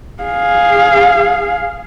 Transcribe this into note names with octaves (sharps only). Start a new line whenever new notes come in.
G#4 F5